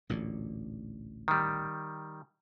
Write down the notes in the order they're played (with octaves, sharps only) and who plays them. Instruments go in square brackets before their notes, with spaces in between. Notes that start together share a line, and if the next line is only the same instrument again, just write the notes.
[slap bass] A1 D2 A#2
[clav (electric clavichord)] D#3 G3